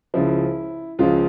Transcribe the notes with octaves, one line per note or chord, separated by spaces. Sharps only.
C#2 C#3 F3 E4
C#2 C#3 F3 F4